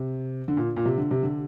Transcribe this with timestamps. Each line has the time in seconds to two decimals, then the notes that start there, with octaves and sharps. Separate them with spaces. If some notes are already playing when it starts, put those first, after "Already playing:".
Already playing: C3
0.48 D3
0.57 A#2
0.77 A#2
0.86 C3
0.98 D3
1.11 C3
1.23 D3